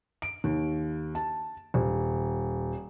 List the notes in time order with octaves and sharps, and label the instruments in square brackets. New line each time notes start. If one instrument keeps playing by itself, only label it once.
[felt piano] D7
D#2
A5
D#1